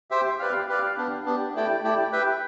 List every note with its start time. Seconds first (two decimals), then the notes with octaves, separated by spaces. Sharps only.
0.11 G4 C5 E5 G5
0.39 G4 B4 D5 F5
0.68 G4 B4 D5 F5
0.97 B3 D4 G4
1.25 B3 D4 G4
1.55 A3 E4 G4 D5 G5
1.83 A3 E4 G4 D5 G5
2.12 G4 B4 E5 G5